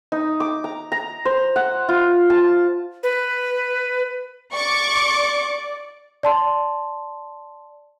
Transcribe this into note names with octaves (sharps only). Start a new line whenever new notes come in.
D#4
D6
A#5
A#5
C5
F#5
F4
A5
B4
D5 C#6 D6
D5 A5 C6